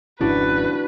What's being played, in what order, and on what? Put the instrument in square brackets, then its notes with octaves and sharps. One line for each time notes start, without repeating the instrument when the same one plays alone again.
[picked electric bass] G#1 F2 C#3 [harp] D4 F#4 [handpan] E4 [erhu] B4